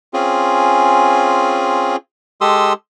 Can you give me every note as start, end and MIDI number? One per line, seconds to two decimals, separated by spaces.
0.13 1.96 60
0.13 1.96 61
0.13 1.96 65
0.13 1.96 68
2.41 2.73 56
2.41 2.73 67
2.41 2.73 69
2.41 2.73 84
2.41 2.73 87
2.41 2.73 88